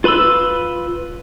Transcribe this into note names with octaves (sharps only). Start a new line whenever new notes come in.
F4 B4 B5 C6 E6